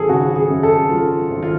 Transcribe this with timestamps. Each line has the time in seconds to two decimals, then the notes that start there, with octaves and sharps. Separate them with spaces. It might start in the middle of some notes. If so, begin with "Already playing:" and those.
Already playing: G#1 F#3 G#4 A4
0.09 C#3 F#4
0.36 G#4
0.50 F#2
0.63 A4
0.89 F#3 F4
1.30 G#1
1.43 F4